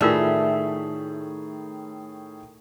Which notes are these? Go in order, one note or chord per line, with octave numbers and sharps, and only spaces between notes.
A2 D#3 A3 F4 G#4 A#4 D5